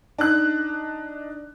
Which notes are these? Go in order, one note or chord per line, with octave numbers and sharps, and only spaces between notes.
D4 D#4 F#6